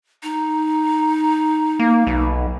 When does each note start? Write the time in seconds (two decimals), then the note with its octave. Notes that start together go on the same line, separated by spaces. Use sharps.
0.23 D#4
1.79 A#3
2.07 B1